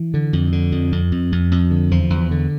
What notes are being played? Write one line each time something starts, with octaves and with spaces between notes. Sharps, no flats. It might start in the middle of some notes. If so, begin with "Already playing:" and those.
Already playing: E3
D3
F2
D3
F2
F2
F2
F2
F2
D3
E2 F3
E2
D3